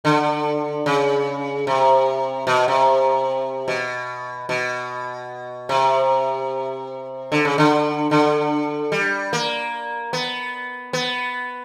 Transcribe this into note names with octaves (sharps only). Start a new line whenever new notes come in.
D3
C#3
C3
B2
C3
B2
B2
C3
D3
C#3
D3
D3
G3
A#3
B3
B3